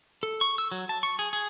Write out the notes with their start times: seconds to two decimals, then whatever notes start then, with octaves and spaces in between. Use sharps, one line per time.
0.23 A4
0.41 C#6
0.58 E6
0.72 F#3
0.89 A5
1.03 C#6
1.19 G#4
1.33 G#4